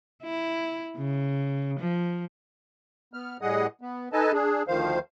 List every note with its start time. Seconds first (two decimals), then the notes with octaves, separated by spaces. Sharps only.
0.23 E4
0.97 C#3
1.79 F3
3.14 B3 F6
3.42 A2 G3 G#4 D#5 F#5 D#6
3.81 B3
4.13 D#4 A4 B4 D#5 G#5 A5
4.33 D4 G#4
4.68 D2 D#3 F3 C5 F5